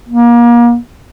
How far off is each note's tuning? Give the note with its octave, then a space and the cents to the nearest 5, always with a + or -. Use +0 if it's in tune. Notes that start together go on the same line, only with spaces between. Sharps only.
A#3 +30